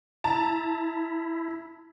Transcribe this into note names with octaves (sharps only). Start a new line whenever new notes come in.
E4 A5 A#5